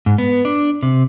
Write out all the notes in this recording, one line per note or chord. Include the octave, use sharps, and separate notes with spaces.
G#2
B3
D4
C3